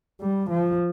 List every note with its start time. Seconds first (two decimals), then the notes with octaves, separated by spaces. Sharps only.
0.21 G3
0.49 F3